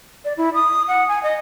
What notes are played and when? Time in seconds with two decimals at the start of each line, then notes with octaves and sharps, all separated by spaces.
0.25 D5
0.37 E4
0.54 D#6
0.88 F#5
1.08 G#5
1.23 D#5